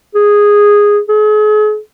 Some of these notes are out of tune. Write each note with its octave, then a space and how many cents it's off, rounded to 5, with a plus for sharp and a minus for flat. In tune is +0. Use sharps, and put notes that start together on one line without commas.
G#4 -10
G#4 +40